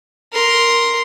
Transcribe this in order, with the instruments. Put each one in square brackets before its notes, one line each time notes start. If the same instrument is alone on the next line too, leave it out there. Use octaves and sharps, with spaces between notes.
[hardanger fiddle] A#4 C6